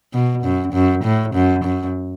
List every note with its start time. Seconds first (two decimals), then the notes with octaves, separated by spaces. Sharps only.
0.14 B2
0.43 F#2
0.73 F#2
1.04 A2
1.34 F#2
1.65 F#2